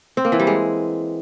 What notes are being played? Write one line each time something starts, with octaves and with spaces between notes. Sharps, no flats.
C4
A#3
E3
G3
G#3